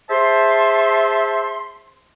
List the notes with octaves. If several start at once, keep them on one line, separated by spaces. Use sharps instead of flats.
G#4 C5 E5 A5 C6